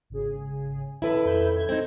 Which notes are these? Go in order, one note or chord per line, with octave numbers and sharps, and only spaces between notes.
G#1 C#3 G#4
D#1 E4 A4 B4 B5
F2 E5 B5 G6
G6 G#6
C4 D#4